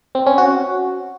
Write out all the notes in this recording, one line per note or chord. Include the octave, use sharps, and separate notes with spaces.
C4
C#4
F#4